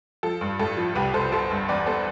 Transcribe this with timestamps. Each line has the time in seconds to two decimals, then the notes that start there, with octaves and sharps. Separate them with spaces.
0.23 F3 A4
0.41 G2
0.59 A2 A4
0.77 F3
0.95 C2 G4 B4
1.14 C2 A4 C5
1.32 G1 A4 C5
1.51 G2
1.68 E2 B4 D5
1.86 B3 A4 C5